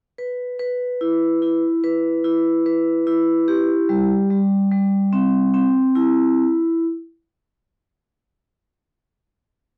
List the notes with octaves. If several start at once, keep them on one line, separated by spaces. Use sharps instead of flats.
B4
B4
E4
E4
B4
E4
B4
E4
G4
G3
G3
G3
C4
C4
E4